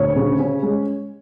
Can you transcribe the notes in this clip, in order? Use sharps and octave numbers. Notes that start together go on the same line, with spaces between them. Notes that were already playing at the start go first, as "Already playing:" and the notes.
Already playing: D2 C#5
C#3
C#4
G#3